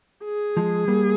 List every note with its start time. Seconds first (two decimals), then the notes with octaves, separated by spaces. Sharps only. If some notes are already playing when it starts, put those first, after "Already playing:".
0.24 G#4
0.57 F3 G#3
0.88 G3 A#3